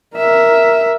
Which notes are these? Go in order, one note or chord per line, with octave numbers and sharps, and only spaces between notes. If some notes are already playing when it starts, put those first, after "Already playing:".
A#4 E5